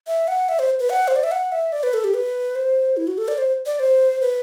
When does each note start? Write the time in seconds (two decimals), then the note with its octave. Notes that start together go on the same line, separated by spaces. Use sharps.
0.07 E5
0.28 F#5
0.49 E5
0.59 C5
0.80 B4
0.90 F#5
1.08 C5
1.16 D5
1.24 E5
1.32 F#5
1.52 E5
1.72 D5
1.83 B4
1.94 A4
2.04 G4
2.15 B4
2.55 C5
2.97 E4
3.07 F#4
3.18 A4
3.28 D5
3.38 C5
3.66 D5
3.80 C5
4.21 B4